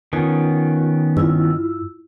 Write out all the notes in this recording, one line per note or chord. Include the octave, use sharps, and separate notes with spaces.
D#3 B3 C#4 F4
G2 E4 F4 E6